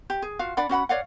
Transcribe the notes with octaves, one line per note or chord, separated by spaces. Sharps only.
G4
G#4
F4 F#4 F5
D4 D5 F#5 B5
C#4 F#4 F#5 B5
C#5 D5 F5 F#5